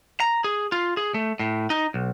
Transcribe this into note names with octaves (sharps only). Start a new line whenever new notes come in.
A#5
G#4
F4
G#4
A3
A2
D#4
B1